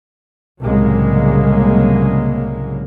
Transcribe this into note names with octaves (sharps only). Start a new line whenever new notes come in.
C2 A2 C#3 F#3 G#3 A#3